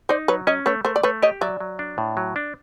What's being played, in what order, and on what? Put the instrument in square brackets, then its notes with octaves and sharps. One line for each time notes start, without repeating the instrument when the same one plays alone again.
[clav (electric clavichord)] D#4 [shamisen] C5 D5
[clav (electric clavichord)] F#3 [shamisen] B4 C#5
[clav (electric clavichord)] C#4 [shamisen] C#5 D#5
[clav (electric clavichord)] A3 [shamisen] B4 C#5
[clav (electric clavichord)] A3 [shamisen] A#4 C5
[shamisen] D5
[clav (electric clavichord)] A3 [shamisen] B4 C#5
[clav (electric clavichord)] G4 [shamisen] C#5 D#5
[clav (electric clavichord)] F#3 [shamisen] D5 E5
[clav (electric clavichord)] F#3
D4
A2
F#3
D4